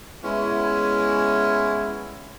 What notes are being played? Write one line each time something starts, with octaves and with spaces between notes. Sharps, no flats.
G#3 B3 C#4 E4